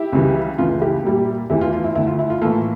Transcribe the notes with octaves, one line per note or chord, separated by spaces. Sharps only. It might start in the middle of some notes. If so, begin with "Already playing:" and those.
Already playing: E4 G4
C#2 C#3 E3 G3
C#2 C#3 E3 A3 F4
E4 G4
A#2 G3 A#3
E2 E3 A3 E4 G4
F4
F4
E4
D2 D3 A3 E4
F4
E4
F4
A2 E3 A#3 F4 A4